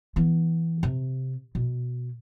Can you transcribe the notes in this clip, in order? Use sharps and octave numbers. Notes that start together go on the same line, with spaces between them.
E3 B3
C3
B2